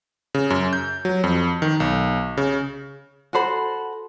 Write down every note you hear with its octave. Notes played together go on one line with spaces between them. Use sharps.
C#3
F#2
G6
F#3
F2
D#3
B1
C#3
F#4 A4 C5 B5